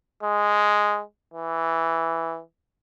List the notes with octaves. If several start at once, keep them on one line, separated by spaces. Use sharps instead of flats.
G#3
E3